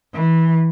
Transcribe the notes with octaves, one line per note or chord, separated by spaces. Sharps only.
E3